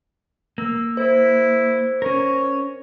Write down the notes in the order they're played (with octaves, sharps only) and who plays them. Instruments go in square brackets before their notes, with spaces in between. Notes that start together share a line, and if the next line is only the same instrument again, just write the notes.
[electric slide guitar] A#3 [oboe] E6
[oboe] E4 [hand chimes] C5
[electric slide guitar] C#4 A#4 [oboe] C#5